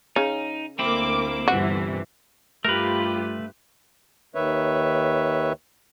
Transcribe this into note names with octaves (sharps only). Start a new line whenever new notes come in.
C#3 C#4 D#4
D2 A#3 C4 E4 D6
G1 C3 E3 F#4
G2 A3 F4 G4 A#4 B4
D#2 D#3 B4 C#5 E5